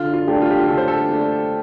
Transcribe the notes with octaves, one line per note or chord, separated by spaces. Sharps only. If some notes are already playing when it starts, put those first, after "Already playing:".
Already playing: D3 F4
F4
A3 D4 G4
F4
G4
F4
D3 A4
C5
A4
A3 D4 G4